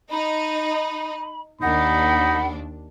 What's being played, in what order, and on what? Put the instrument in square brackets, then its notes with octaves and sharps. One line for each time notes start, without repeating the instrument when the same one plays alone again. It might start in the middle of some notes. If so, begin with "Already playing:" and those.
[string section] D#4 [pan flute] B5
[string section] D#2 D4 [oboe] D#4 [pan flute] F#5 [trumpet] B5